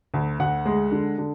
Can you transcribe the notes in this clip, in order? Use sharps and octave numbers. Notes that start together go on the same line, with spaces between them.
D2
D2 F#5
G#3
D3
D3